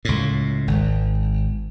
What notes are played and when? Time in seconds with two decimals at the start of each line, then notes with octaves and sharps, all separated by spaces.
0.05 C#2 A2
0.68 G#1